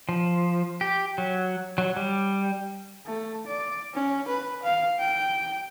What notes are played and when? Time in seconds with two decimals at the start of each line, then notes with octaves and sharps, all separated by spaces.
0.09 F3
0.81 G4
1.18 F#3
1.78 F#3
1.97 G3
3.06 A3
3.47 D5
3.94 C#4
4.29 B4
4.63 F5
4.99 G5